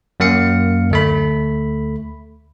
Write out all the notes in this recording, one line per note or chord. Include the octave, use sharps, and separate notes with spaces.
F#2 A#3 F5 C#7
D2 A3 B5